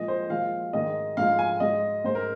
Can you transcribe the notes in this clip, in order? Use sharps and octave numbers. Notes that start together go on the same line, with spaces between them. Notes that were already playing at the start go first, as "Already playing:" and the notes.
Already playing: A#2 F3 G#3 D#5
C5
A#2 F3 G#3 F5
G#2 D#3 G#3 D#5
G#2 F3 G#3 F5
G#5
G#2 G#3 D#5
G#2 G#3 C5
A#4